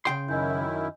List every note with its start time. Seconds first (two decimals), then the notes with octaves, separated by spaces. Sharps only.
0.05 C#3 G5 C6
0.29 F#2 D#3 E4 D#5 G#5 G6